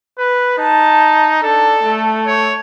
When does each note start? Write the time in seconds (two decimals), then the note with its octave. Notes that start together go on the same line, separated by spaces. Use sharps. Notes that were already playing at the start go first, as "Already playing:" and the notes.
0.19 B4
0.58 D#4 A5
1.43 D4 A4
1.83 A3
2.27 C#5